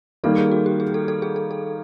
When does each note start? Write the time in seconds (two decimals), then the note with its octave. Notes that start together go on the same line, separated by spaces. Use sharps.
0.24 D#3 G3 A#3 A4
0.38 G#4
0.51 F#4
0.66 G4
0.80 G#4
0.94 A4
1.08 A4
1.22 G#4
1.36 A4
1.51 A4